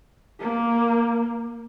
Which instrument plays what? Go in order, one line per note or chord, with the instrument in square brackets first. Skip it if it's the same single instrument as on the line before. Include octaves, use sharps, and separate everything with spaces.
[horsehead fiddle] A#3